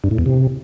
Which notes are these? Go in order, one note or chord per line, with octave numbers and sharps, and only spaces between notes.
G2
A2
E2
C3